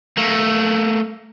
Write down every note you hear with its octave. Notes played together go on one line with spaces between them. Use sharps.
A3 A#3